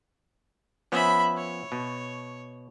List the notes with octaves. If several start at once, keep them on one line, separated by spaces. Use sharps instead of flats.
F3 B3 C#4 E5 B5
C#5
B2